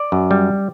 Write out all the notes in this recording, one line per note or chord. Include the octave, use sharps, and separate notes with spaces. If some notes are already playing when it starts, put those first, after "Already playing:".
Already playing: D5
F#2
G3